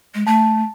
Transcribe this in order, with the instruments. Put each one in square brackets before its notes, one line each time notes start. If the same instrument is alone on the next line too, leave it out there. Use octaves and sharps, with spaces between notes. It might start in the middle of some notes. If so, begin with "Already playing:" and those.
[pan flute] G#3
[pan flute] A3 [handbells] A5